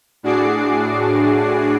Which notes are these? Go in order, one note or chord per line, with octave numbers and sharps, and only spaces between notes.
A2 D4 F#4 G#4 D6 C7